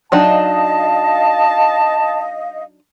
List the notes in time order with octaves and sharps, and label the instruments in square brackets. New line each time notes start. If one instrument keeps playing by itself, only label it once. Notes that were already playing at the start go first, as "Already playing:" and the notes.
[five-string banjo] F#3 D4 D#4 [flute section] D#5 F5 [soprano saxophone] A5